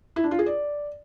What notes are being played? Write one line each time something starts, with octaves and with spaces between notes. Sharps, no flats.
E4
D4
F4
G#4
D5